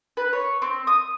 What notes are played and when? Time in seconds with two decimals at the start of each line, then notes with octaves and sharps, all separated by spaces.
0.17 B4
0.33 C#5
0.62 C4
0.87 D#6